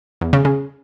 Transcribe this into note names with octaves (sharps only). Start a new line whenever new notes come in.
E2
C#3
C#3